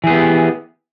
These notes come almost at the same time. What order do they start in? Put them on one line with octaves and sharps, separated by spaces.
E3 G#4 B3 G4